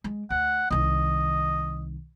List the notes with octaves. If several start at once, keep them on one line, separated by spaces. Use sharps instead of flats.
G#3
D2 F#5
C2 D#3 D#5